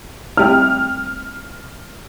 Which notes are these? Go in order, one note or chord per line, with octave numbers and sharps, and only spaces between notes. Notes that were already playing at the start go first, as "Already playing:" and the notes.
G3 A3 C4 E4 G4 F6